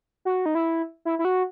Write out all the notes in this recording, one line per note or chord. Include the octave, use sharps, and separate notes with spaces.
F#4
D#4
E4
E4
E4
F#4